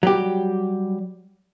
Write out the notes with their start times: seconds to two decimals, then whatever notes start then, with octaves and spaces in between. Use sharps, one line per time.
0.03 F#3 G3 G4